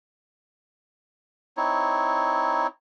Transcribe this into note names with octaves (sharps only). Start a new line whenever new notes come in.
C4 D#4 E4 C#5